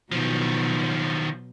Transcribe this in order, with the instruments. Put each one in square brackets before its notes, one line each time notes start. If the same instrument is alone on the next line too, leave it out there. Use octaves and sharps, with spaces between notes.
[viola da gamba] B2 F#3 [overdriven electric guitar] D#3 F3